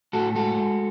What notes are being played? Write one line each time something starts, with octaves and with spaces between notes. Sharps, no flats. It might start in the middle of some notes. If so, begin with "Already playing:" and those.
A2 F#4 A4
G#3 F#4 A4
G#3